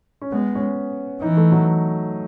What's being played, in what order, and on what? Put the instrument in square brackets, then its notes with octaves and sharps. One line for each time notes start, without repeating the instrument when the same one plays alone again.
[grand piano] C#4
[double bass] G#3 [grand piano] B3
[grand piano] C#4
[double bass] E3 [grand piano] D#4
[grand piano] A3
F#3